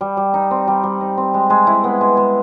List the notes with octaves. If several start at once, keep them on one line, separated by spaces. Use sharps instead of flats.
G3
G3
D#4
C4
G3
G3
D#4
C4
G#3
G#3
E4
B3
G#3
G#3